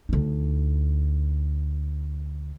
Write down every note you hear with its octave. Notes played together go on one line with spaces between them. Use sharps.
D2 D#4